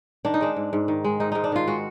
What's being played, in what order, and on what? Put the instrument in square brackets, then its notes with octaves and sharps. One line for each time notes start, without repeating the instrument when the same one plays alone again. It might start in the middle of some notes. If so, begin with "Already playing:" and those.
[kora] D#3 D4
D#4
G#3 D4
G#2
G#2
D#3
G#3
G#2 D#4
G#2 D#4
D4
D#3 F4
G#3 F#4